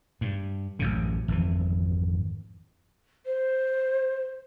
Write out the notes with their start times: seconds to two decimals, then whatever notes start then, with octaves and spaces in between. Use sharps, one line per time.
0.21 G2
0.79 A1 F#2 C#3
1.28 G#1 F2 E3
3.26 C5